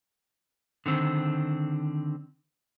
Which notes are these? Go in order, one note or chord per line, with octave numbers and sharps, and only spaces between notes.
D3 D#3 C4